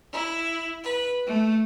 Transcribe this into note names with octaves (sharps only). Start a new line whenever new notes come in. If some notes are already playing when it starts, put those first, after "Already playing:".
E4
B4
A3